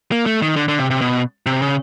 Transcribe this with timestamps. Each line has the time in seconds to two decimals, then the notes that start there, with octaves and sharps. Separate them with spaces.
0.12 A#3
0.26 A3
0.42 D#3
0.56 D3
0.68 D3
0.79 C3
0.90 C3
1.01 B2
1.46 C3
1.62 C#3